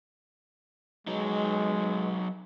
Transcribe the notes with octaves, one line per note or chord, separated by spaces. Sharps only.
F#3 G#3 D#4